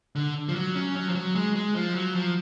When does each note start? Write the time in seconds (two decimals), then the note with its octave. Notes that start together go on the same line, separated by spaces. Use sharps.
0.15 D3
0.49 F3
0.56 F#3
0.76 C#4
0.95 F#3
1.09 F3
1.15 F#3
1.35 G#3
1.56 G#3
1.75 F3
1.95 F#3
2.15 F3